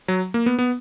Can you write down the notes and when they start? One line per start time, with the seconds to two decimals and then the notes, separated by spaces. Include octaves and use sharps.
0.08 F#3
0.34 A#3
0.46 B3
0.59 B3